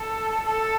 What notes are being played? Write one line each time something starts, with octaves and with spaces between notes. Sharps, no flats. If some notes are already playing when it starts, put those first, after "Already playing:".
Already playing: A4
A4